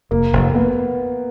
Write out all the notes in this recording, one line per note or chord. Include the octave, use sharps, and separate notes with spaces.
F1 A#3
F1
B3